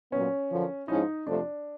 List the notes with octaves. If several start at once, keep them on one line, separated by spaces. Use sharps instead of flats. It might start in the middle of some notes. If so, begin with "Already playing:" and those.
A#2 F#3 B3 C#4
F#2 D3 F3
G#2 F3 G#3 C#4 D#4 E4
F2 C3 F3 A3 D4